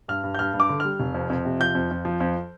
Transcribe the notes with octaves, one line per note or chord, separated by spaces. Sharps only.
G2 F6
G2
G6
G2 F6
G2
D6
D3
G3 F6
F1
F2
F2
C3
F3 G6
F2
F2
F3
F2